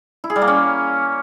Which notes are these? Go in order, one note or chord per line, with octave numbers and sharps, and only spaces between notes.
E4
G#4
G3
A#3
C#4